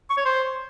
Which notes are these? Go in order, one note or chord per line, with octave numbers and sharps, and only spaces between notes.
C#6
C#5
C5